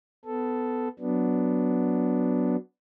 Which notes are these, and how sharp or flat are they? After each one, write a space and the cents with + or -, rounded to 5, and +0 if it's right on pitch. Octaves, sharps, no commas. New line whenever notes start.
B3 +20 A4 +0
F#3 +0 B3 +0 D4 -5